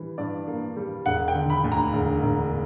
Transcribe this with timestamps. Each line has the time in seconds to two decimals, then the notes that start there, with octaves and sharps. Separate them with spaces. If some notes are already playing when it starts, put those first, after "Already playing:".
Already playing: E3 G3
0.18 G2 D5
0.47 A#3
0.77 G3
1.06 E1 F#5
1.28 G5
1.35 D3
1.50 B5
1.64 D2
1.72 A#5
1.93 E1
2.23 E1